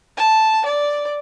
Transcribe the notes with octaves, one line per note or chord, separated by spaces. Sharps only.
A5
D5